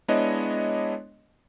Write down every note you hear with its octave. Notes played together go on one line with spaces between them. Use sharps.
G#3 B3 D4 E4 C#5 D#5